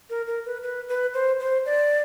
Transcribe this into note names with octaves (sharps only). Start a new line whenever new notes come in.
A#4
A#4
B4
B4
B4
C5
C5
D5